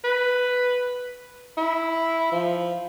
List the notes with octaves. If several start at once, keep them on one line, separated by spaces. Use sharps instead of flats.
B4
E4
F3